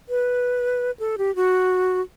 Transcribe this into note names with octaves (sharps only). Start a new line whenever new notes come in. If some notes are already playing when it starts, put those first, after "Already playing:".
B4
A4
G4
F#4